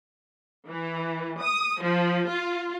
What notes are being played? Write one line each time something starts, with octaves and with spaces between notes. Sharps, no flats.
E3
D#6
F3
F4